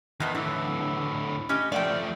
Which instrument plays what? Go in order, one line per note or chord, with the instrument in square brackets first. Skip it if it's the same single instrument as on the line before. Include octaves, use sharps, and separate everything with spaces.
[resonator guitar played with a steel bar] E2 B2 B3 [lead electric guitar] D#3 D#5
[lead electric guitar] A2 D3 [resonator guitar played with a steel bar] E3
[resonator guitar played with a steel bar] C#4 G4 D#5
[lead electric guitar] F3 A3 [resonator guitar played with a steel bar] D5 F#5 G5